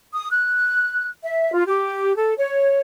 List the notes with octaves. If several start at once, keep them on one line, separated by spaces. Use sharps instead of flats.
D#6
F#6
E5
F4
G4
A4
C#5